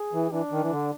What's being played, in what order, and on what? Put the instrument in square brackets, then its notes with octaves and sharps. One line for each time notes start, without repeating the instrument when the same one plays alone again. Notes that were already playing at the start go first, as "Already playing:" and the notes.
Already playing: [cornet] G#4
[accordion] E3
[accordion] E3 [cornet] D4
[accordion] D#3
E3
D3